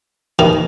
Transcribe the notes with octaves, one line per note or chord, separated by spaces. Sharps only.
D#3